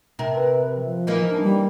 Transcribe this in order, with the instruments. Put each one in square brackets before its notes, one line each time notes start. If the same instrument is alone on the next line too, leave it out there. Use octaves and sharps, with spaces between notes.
[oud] C3 A#4
[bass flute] B4
F3
[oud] E3 A#3 D#4
[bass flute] D4
G3